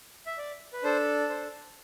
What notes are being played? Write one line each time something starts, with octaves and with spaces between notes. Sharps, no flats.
E5
D5
B4
D4 A4 C5
C5